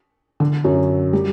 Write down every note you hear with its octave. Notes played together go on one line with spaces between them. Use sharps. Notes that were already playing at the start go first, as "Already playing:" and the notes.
D3
F#2 F#3
G3